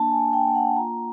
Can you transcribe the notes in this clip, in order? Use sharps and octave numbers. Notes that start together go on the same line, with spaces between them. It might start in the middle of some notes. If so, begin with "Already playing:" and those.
Already playing: A#3 D4 A5
G#5
A#3
G5
A#3
F#5
F4 A#5